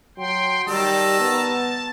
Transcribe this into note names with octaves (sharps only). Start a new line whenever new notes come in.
F#3 G5 C6
D#3 G3 A5 A#5 E6
B3